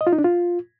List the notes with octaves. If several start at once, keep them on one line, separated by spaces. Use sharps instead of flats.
D#5
F4
D#4
D4
F4